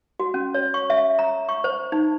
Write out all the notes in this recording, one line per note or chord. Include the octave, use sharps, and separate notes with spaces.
F#4
C#4
C#5
C#6
E5
A#5
C#6
C5
D#4